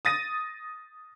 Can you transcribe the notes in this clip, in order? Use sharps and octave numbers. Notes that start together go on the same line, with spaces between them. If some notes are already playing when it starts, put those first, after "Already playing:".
D#6 A6 A#6 D#7